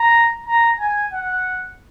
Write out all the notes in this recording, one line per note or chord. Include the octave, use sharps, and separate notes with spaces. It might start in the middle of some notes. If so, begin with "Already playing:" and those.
Already playing: A#5
A#5
G#5
F#5